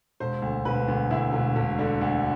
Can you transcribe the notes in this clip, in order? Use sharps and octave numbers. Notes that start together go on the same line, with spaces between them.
E1 C5
D2
E1 B4
D2
D2 E4
E1
E1
D3
D2